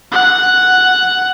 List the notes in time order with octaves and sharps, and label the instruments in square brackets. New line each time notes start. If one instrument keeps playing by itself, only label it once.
[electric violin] F#5